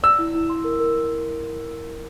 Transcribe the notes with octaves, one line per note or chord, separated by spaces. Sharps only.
D5 E6
E4
E4
C6
A#4
A#4